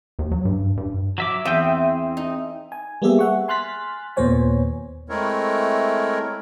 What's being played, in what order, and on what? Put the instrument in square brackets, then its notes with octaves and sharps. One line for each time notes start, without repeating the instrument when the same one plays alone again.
[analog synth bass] D#2
F#3
G2
G2
[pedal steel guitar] F#3 E5 D6
[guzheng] E2 [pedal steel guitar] C4 G#4 [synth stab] E5 G5
[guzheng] D#4
[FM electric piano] G#5
G3 A#3 B3 G4 G#4 E5
E5 F#5 C#6
G#5 C6 F6 F#6 A6 B6
D#2 A#2 B3 C5 C#5 G#5
[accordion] G#3 A3 C4 E4 A#4 C#5